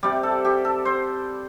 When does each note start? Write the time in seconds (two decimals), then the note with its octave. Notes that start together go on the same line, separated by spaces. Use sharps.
0.03 C3 G3 D5
0.23 A4
0.45 G4
0.65 A4
0.85 C5